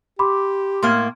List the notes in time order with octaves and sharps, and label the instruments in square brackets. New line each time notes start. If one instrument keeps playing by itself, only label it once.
[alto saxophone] G4 [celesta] B5 C6 D6
[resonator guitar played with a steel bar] A2 A#3 [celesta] C6 F6 G#6